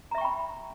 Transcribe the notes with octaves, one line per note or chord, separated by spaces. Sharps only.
E5 G5 A#5 B5 C#6